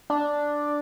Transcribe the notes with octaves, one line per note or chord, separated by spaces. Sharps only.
D4